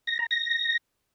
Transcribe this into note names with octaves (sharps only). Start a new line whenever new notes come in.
A#6
A#5
A#6